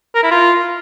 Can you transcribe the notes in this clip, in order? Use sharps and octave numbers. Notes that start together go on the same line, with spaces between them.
A#4
E4
F4